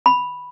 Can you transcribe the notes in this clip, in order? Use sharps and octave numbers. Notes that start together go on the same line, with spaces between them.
B5